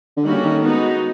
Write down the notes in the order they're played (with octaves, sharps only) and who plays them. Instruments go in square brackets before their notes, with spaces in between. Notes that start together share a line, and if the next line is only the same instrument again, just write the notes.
[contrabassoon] D3
[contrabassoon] D#3 [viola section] G3 A#3 C#4 F#4 A4
[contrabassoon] D#3
[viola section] G#3 B3 D#4 F#4